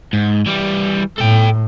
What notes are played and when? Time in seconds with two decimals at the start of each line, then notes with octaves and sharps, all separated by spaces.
0.13 G#2
0.46 E3 G3
1.18 A2 A4 G5